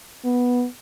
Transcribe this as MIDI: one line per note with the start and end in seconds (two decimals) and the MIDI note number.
0.24 0.66 59